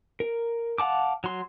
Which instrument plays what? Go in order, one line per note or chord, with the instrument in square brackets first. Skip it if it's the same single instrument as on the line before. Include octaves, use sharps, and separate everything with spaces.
[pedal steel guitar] A#4
F5 F#5 A5 D6
F#3 C6